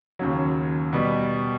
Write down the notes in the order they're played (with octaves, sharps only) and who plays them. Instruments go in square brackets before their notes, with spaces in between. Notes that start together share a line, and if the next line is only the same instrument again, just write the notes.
[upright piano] D#2 C#3 F#3
B2 G3 B3